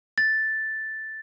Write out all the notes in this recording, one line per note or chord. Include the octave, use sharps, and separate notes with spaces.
A6